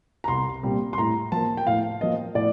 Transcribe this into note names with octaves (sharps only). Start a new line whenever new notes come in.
A#5
C2 C6
A#2 G3 C4
C6
A2 A#5
F3 A#3 A5
G5
A2 F5
F3 A#3 D#5
A2 D5